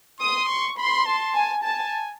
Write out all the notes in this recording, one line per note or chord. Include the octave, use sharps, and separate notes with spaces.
C6 D#6
C#6
B5 C6
A5
G#5
G#5 A5